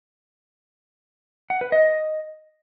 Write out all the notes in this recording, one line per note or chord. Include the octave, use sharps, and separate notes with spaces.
F#5
B4
D#5